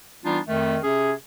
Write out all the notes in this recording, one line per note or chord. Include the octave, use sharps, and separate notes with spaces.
E3 G3 B3 D4 D#4 F4
F2 D#3 A3
C3 C#4 G#4